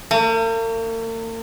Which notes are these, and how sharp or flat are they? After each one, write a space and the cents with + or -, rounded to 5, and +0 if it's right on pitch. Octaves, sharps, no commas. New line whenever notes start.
A#3 -45